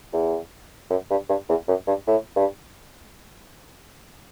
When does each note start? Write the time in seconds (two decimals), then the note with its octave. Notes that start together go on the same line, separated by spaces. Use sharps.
0.13 E2
0.90 F#2
1.10 G2
1.29 G2
1.49 E2
1.68 F#2
1.87 G2
2.07 A2
2.36 G2